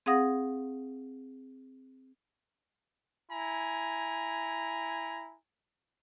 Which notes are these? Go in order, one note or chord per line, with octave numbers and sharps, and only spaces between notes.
C4 G#4 F5 F#5 D#6 A#6
E4 G#5 A#5